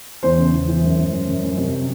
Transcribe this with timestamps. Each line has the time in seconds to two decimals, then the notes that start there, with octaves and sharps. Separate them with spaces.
0.23 E2 C5
0.38 C#3
0.53 E2
0.68 E3
0.84 F#2
0.98 F#2
1.13 F#2
1.28 F#2
1.43 F#2
1.58 C3